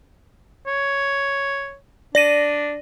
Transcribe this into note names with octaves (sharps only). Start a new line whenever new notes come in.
C#5
D4 D5 A#6 D#7